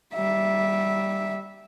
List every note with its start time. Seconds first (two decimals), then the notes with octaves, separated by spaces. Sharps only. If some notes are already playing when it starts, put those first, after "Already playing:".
0.14 G3 E5